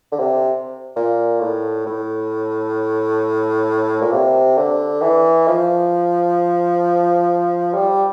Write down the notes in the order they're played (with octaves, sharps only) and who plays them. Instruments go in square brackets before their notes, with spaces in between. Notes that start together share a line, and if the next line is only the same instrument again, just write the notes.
[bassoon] D3
C3
A#2
A2
A2
A#2
C3
D3
E3
F3
G3